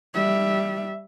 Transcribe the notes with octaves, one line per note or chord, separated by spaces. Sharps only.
G3 E5